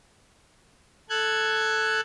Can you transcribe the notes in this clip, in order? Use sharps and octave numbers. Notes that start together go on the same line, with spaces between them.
A4 F#6 G#6